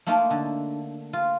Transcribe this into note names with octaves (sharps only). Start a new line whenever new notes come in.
A3 A#3 D#4 F4
D3
F4